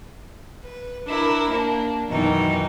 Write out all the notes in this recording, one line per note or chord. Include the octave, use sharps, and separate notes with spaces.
B4
D4 E4 A#4
A#3 D4
F#2 B2 D#3 E3 D#4